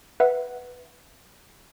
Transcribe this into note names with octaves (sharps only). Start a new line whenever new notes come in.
B4 E5 F#5